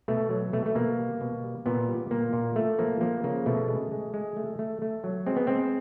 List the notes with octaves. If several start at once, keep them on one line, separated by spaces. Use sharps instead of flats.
B2 A3
F#3
B2 A3
A3
B2 A#3
G3
B2
G3
A#2 B3
G3
A#2 A#3
A#2
A3
F3 A#3
F3 A#3
C#3 A#3
B2 A3
G#3
G#3
G#3
A3
A3
A3
F#3
G#3 C4
B3
G#3 C4